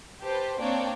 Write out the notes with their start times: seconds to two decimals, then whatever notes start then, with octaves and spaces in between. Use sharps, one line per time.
0.23 G4 B4 C5 A5
0.58 A#3 C4 D4 C#5 G5 A5